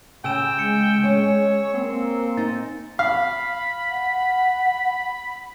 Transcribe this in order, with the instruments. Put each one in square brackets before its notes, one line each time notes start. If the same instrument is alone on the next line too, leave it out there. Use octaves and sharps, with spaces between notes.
[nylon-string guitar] C#3 [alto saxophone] G5 [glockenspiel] G#5 E6 E7
[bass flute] G#3 [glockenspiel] C#7
[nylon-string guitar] C#4 [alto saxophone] C#5
[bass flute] A#3 [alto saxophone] C4
[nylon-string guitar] D#4 [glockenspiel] A6
[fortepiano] F5 [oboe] B5
[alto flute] F#5